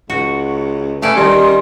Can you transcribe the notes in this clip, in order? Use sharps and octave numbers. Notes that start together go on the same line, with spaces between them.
C#2 F#4
A3 C#4 B4 D5 F5
D#3 G3 C6